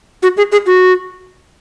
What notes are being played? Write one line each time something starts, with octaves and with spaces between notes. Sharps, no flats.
F#4
G#4
G#4
F#4